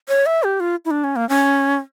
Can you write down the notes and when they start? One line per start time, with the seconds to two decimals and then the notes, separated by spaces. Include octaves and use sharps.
0.08 C#5
0.26 E5
0.43 G4
0.60 F4
0.85 E4
0.91 D4
1.04 C#4
1.16 A#3
1.29 C#4